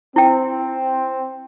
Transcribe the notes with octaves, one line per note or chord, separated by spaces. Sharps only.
C4 E4 G5